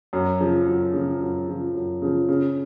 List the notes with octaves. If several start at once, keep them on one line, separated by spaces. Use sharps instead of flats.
F#2
C#3 F3
F#2
C#3 F3
F#2
C#3 F3
F#2
C#3 F3
C#3